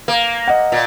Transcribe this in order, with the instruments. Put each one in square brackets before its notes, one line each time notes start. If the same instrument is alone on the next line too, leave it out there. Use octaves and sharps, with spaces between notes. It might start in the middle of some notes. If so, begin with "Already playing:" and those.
[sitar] A#3
[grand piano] D#5 F#5
[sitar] A#2